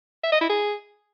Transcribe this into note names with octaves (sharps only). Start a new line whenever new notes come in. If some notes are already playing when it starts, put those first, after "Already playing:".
E5
D#5
E4
G#4